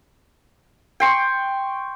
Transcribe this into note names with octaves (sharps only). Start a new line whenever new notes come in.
G5 C6 C#6